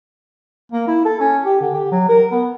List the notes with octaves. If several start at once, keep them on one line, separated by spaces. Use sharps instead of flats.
A#3
E4
A4
C#4
G4
D3
G4
F#3
A#4
B3